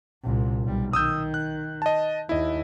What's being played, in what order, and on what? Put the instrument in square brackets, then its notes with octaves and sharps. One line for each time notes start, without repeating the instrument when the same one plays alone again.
[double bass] C2 A#2
B1 G3
[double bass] D#3 [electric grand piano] D#6 E6 G6
[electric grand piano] F#6
D#5 A5
[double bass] D#2 [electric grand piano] E4 D#5